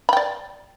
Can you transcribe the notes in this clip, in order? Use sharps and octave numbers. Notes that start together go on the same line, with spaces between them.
D5 G5 B5